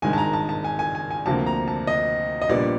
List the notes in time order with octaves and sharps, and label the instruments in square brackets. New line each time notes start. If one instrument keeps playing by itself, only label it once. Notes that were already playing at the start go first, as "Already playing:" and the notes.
[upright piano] G#1 G2 D#3 G#3 G#5
A5
A#5
A5
A5
G#5
G#5
G#5
G#5
D2 C3 F3 A#3 A5
A#5
A5
D#5
D#5
A#1 A#2 G3 B3 D4 D5